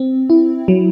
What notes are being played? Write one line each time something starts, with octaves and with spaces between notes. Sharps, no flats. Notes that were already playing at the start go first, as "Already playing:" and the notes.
Already playing: C4
E4
F#3